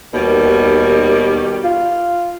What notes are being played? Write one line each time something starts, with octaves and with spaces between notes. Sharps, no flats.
D#2 B2 D#3 G3
F4